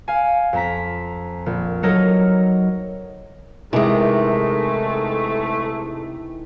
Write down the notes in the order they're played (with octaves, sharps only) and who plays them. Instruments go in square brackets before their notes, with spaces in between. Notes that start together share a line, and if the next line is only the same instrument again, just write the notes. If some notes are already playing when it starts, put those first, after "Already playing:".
[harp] F5 G#5
F2 C4 A#5 B6
A#1
F#3 D#4 A4 A#4 C#5 D#5
[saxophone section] G#2 A3 [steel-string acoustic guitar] C3 G#3 [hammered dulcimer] D#3 E3 D6